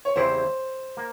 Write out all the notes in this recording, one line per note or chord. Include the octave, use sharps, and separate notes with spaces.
C#5
E2 C#3 G3 C4 E4 C5
A#3